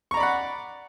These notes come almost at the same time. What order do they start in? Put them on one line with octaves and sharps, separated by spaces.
C#6 A#5 D5 B5 F#5